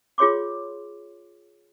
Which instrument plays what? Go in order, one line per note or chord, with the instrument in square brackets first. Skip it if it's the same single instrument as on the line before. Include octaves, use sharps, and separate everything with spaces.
[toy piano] F4 G#4 C#5 C6 D6